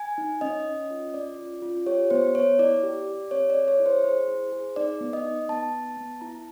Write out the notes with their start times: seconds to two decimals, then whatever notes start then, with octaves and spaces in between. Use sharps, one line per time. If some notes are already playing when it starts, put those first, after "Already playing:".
Already playing: G#5
0.18 D#4
0.41 C#4 D#5
0.65 C#4
0.90 F4
1.14 C#4 D5
1.39 F4
1.62 F4
1.86 G4 C#5
2.10 B3 C5
2.35 B3 C#5
2.59 E4 D5
2.83 G4
3.07 G4
3.31 C4 C#5
3.50 D5
3.56 G#4
3.68 C#5
3.79 E4
3.86 C5
4.04 G#4 C5
4.28 E4
4.52 G#4
4.76 D#4 D5
5.01 B3
5.13 D#5
5.25 D#4
5.49 B3 A5
5.73 B3
5.97 B3
6.21 E4 A#5